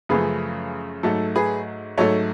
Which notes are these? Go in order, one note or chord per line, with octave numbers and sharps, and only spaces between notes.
F#2 C#3 F3 A3 G#4 B4
G#2 F#3 A3 A4
G#4 B4
G#2 F#3 A3 A4 C#5